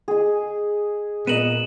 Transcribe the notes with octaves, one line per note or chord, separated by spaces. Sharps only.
G#4 D#5
A#2 B3 A#4 D#5 D#7 E7 F#7